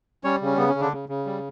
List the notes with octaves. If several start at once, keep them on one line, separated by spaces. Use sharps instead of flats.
G3 C#4 C#5
C#3 C#4
C#3 B3
C#4
C#3
D3 D4
C#3
C#3
G3